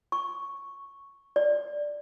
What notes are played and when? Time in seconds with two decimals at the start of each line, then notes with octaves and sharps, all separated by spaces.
0.12 C#6
1.36 D5